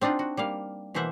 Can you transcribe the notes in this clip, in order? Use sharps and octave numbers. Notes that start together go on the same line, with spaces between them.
C4 D4 D#4 F4 F#5
F#4
G3 A#3 F5
B2 E3 A#3 C5 E5 F#5